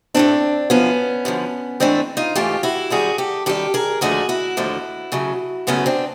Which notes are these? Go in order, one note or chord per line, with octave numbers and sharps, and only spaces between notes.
A2 F#3 A3 C4 D4
F#2 D3 F3 B3 C#4
F#2 D3 F3
G#2 E3 A3 C4 D4
D#4 F4
G#2 E3 A3 F4 G4
E4 F#4
F#2 D#3 G3 F#4 G#4
G4 A4
F#2 D#3 G3 G4 A4
G#4 A#4
D#2 D3 F3 A3 F#4 G#4
E4 F#4
D#2 D3 F3 A3
F#2 C#3 F#3 A3
F#2 C#3 F#3 A3 B3 C#4
C4 D4